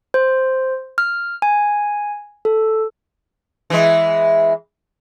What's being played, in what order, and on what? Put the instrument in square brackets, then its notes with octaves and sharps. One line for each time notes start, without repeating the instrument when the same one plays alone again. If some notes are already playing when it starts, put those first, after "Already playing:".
[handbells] C5
F6
G#5
A4
[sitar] E3 G#3